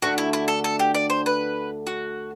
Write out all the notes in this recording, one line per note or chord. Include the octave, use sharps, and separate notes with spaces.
D2 D3 A3 D4 F#4
E4
E4
A4
A4
G4
D5
C5
B4
F#4